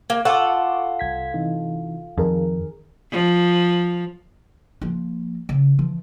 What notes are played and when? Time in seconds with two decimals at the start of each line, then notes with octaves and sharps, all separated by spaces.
0.10 A#3 G#6
0.25 F4 A4 F#5 C#6 D6
0.99 C2 G#6 B6
1.34 C3 E3 D#4
2.18 F2 D#3 G#4 A#4
3.12 F3
4.81 F3 A#3
5.49 C#3
5.79 E3 F3